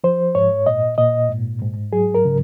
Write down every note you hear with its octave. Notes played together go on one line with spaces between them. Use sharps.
F3 C5
G#2 C#5
A#2 D#5
A#2 D#5
G#2
G#2
F#3 G#4
A#4
C#3